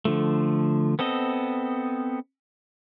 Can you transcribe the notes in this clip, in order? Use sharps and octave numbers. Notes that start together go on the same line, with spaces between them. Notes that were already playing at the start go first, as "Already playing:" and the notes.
D3 F3 A3
B3 C4 A4 D#5